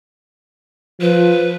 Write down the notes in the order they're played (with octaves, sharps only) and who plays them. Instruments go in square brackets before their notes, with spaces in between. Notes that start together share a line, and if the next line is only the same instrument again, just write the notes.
[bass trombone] F3 [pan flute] B4